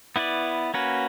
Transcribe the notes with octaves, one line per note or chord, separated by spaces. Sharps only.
B3 E4 B4 D5
A#3 C#4 F#4 B4